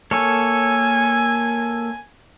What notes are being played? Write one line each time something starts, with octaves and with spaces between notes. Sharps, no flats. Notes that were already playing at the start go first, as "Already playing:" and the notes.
A#3 A4 C#5 G#5